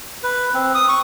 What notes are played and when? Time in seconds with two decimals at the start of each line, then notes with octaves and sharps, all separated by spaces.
0.23 B4
0.54 C4
0.75 D#6
0.89 C#6